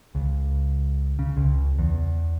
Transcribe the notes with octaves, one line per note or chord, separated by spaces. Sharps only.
C#2
C#3
C#2
E2